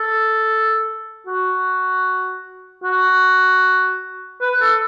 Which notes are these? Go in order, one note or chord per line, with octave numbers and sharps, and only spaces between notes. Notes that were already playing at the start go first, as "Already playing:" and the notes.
Already playing: A4
F#4
F#4
B4
A4